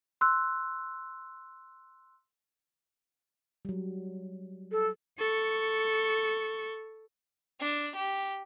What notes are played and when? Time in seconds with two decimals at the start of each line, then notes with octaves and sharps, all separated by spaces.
0.21 C6 E6 F#6
3.65 F#3 G3
4.72 A4
5.19 A4 C#6
7.60 D4
7.95 G4